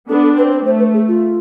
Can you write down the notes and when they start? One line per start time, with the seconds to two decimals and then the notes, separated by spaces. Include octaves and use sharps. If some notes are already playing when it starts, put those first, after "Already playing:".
0.09 B3 D4 A4
0.23 A4
0.37 C4 B4
0.52 C5
0.65 A3 C5
0.79 B4
0.94 G#4
1.08 F4